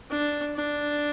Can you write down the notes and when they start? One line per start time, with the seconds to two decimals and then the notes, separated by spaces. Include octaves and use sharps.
0.11 D4
0.56 D4